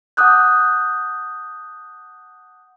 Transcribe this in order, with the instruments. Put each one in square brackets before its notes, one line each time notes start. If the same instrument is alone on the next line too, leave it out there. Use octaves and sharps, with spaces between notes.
[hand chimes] F#5 A5 D6 D#6 F#6 G6